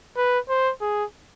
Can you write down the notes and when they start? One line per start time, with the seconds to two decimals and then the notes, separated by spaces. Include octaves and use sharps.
0.17 B4
0.49 C5
0.81 G#4